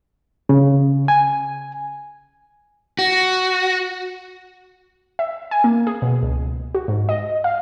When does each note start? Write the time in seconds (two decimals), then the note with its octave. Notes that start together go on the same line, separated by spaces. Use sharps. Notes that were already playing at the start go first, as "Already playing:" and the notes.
0.49 C#3
1.08 G#5
2.99 F#4
5.19 E5
5.51 G#5
5.64 A#3
5.87 G#4
6.02 B2
6.23 C#2
6.75 F#4
6.88 G#2
7.09 D#5
7.44 F5